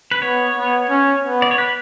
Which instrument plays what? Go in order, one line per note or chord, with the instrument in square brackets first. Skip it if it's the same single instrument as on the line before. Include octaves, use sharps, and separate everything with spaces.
[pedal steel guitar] B4
[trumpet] B3 [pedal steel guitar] C#5
[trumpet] B3
C#4
B3
[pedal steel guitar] D5
C#5
B4